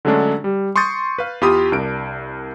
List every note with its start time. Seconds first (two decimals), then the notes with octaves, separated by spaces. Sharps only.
0.05 D3 F#3 G#3 A3 C#4 D4
0.44 G3
0.76 C6 C#6 D#6 G6 A6
1.18 B4 F5
1.41 E2 F4 G4 B5 D#6
1.72 C2 D4 A#4 D7